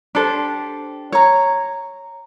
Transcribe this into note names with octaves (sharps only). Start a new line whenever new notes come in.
D4 G4 A4 C5
C#5 A#5